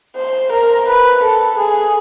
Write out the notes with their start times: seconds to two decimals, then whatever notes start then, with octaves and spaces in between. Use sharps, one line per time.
0.17 C5
0.52 A#4
0.88 B4
1.23 A4
1.58 G#4